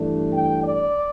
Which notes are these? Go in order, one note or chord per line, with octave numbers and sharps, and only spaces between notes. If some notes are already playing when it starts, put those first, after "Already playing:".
Already playing: G2 E3 A3 D4
G5
D5